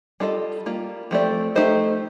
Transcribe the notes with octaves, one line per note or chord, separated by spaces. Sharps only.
G3 D4 F4 A4 D#5
G3 A#3 F4
F3 A3 C4 G4 D5
A3 D#4 G4 C5 D#5